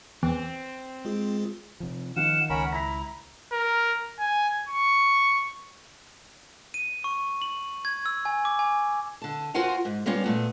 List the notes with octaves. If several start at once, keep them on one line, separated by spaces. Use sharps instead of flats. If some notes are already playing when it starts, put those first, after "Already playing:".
E2 C4
G#3 F4 G#4
C3 F3
D#3 F3 F5 F#5 E7
C#2 C#4 A#4 F#5 B5
E4 A#5 A#6 B6
A#4
G#5
C#6
D#7
C#6
F#7
G#6
E6
G#5
D6
G#5
D3 A5
F4 F#4 A#4 C5 F#5 G#5
G#2
G3 A#3 B3 C#4 F4
A#2 A3 B3